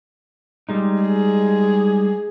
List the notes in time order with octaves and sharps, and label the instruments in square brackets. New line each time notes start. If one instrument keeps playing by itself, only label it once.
[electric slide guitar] G3 G#3 D#4
[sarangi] G#4